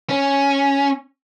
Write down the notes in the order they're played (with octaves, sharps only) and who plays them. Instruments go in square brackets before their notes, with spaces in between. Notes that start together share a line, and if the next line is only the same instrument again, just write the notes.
[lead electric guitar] C#4